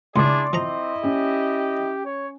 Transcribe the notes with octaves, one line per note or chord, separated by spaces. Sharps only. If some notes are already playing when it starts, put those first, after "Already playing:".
C#2 D4 E4 G#4 D5 C6 D6
F3 C4 E4 D#5 A#5
C#4 G4
C#5